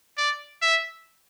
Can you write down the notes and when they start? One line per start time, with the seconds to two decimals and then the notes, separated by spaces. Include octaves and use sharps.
0.18 D5
0.62 E5